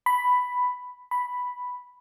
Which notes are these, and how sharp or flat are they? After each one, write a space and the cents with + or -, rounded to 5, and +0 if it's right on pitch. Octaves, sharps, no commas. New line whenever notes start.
B5 +5
B5 +0